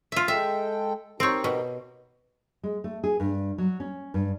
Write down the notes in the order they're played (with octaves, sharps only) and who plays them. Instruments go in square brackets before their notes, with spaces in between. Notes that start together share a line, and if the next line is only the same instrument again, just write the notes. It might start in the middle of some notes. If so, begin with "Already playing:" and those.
[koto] F4 E5
[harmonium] G#3 A4 G5 [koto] E5
[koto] C4 C#5 [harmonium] D#4 G4 A#4
[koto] B2
[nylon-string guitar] G#3
A3
G#4
G2
F#3
C#4
G2